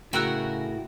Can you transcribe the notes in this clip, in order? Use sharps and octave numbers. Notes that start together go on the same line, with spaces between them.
A2 C#3 E4 F#4 A#4 G5 E6 F#6